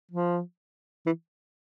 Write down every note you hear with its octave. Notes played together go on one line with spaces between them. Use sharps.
F3
E3